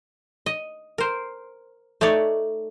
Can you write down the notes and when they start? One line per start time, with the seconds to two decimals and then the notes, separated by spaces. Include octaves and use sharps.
0.46 D#5
0.98 A#4 C5
2.01 A3 D#4 C#5 D5